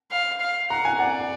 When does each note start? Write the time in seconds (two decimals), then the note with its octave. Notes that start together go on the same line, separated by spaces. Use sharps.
0.11 F5
0.40 F5
0.70 F#5 A#5
0.85 G#5
0.99 D5 F#5